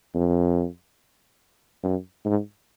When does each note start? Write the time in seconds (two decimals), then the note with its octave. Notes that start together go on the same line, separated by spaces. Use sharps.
0.15 F2
1.83 F#2
2.25 G#2